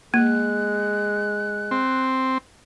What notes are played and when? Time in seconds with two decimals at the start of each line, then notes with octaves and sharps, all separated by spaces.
0.14 G#3 A#3 F#6
1.71 C4